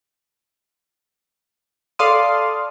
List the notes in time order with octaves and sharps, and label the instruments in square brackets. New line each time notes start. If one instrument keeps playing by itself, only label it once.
[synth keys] A4 D5 F5 C6 D#6